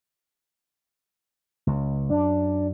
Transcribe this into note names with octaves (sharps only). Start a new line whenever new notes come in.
C#2
F#2 D4